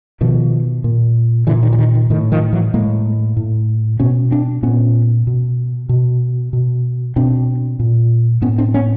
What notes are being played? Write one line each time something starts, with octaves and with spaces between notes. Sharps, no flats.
B2 D#3 F3
A#2
A#2 D3 E3
D#3
E3
D#3
D#3
A2 D#3
D#3 F3
E3 F#3
A2 G#3 A#3
A2
B2 B3 C#4
C4 D4
A#2 B3 C#4
B2
B2
B2
B2 C4 D4
A#2
A2 B3 C#4
C4 D4
B3 C#4